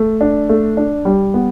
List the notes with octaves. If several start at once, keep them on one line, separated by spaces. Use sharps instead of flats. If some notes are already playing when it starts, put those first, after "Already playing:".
Already playing: A3
D4
A3
D4
G3
B3